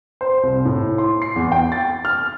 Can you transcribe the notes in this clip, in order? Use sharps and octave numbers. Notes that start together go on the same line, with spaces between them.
C5
C2
A2
C6
C7
E2
G5
A6
F6